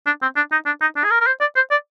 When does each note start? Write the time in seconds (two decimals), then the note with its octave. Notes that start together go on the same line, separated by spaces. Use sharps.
0.06 D4
0.22 C4
0.36 D4
0.52 D#4
0.66 D4
0.81 D#4
0.96 D4
1.04 G#4
1.11 A#4
1.21 A#4
1.26 C5
1.41 D5
1.56 C5
1.71 D5